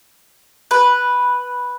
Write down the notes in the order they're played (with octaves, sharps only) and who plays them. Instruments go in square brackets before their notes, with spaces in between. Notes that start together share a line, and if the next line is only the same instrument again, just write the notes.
[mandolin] B4